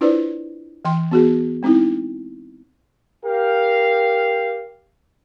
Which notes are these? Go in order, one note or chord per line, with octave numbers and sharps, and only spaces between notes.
D4 E4 F4 B4 C5 D5
E3 G5 C6
B3 F#4 G#4
G#3 C4 D#4 E4
G4 A#4 F5